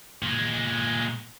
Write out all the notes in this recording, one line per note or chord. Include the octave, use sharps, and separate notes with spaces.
A#2 G#3